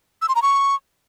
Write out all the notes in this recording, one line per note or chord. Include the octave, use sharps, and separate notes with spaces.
E6
C6
A#5
C#6